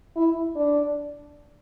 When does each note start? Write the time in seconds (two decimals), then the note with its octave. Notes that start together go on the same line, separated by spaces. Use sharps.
0.16 E4
0.55 D4